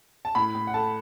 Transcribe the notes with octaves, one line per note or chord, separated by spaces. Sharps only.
A5
A2 B5
A2
F#5
A3 A5